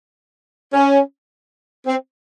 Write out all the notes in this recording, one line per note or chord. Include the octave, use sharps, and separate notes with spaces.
C#4
C4